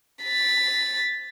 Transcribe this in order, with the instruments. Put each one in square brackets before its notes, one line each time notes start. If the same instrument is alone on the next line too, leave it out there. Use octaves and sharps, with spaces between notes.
[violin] A6 B6